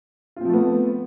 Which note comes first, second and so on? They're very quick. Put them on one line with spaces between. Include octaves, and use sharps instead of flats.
F4 C4 F3 A3 B3